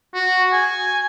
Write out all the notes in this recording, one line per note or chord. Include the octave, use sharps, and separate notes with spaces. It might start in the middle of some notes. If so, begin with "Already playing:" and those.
F#4
G#5